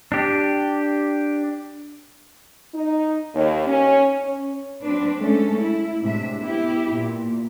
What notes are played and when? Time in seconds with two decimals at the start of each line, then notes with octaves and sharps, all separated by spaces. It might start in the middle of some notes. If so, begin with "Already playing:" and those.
0.12 D4 G4
2.74 D#4
3.33 D#2
3.67 C#4
4.23 C#4
4.83 F#3 C4 D4 B4
5.19 G#3 A3 C#4 A4
5.60 E4
6.02 A2 C3 G#3 D4 E5
6.39 B3 E4 G4
6.92 A#2